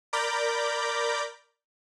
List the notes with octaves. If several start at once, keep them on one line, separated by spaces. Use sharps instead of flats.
A#4 D5 A#5 B5 D6 G6